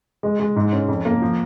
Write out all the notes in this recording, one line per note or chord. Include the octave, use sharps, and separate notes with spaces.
G#3
G#3
G#2
C#4
F2
A#3
F3